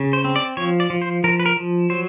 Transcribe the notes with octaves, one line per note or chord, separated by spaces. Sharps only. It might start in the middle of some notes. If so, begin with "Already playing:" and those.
Already playing: C#3
C5
C4
D5
F3 C#5
D5
F3
C5
F3 A#4
B4
A#4
F3
F#3 C5